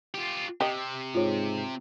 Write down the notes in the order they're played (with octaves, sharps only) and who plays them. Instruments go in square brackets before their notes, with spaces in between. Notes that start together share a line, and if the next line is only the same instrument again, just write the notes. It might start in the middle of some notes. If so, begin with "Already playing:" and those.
[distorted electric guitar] F4 G4
[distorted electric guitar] C3 [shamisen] G4 D#5
[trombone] G#2 [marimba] F4 C#5